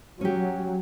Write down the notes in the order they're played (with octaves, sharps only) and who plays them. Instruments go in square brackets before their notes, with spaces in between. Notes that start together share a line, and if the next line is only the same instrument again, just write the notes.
[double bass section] F#3 [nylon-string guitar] C#4 G4